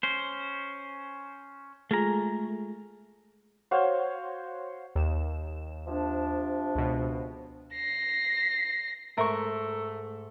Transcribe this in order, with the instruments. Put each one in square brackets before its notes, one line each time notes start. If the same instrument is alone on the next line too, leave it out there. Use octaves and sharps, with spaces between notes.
[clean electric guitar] C#4 C5
[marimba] G#3 F4 G#4 [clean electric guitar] A3 A#5
[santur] F#4 C5 C#5 F5
[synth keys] D#2 E7
[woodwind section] C3 F3 D4
[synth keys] C#2 B2
[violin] A#6 C7
[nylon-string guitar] G#2 E5 [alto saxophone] A3 [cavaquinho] A#4 C#6